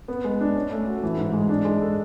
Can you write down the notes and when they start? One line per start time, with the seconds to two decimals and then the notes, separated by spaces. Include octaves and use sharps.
0.08 B3
0.24 G#3
0.41 D4
0.56 C#4
0.72 A3
0.87 F#4
1.03 E3
1.18 G#2
1.33 G#3
1.49 D4
1.65 G#3
1.82 A4